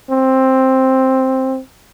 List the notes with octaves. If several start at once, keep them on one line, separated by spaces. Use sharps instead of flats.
C4